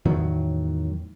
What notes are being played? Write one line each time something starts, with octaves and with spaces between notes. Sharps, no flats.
E2 A2 D#3 F#3